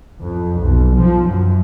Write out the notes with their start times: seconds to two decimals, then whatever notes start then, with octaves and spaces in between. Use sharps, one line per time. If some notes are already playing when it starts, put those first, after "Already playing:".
0.19 F2
0.57 B1
0.96 F3
1.27 F#2